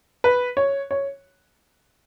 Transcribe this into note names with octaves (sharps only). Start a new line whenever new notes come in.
B4
C#5
C#5